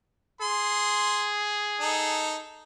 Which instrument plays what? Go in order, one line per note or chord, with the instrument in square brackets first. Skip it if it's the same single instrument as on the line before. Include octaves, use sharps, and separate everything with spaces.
[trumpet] G#4 [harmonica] C6
[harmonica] D#4 A4